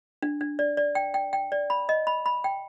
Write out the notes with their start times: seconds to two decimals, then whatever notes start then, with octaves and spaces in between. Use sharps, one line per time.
0.22 D4
0.41 D4
0.59 D5
0.77 D5
0.95 G5
1.14 G5
1.33 G5
1.52 D5
1.70 B5
1.89 D#5
2.07 B5
2.26 B5
2.44 G5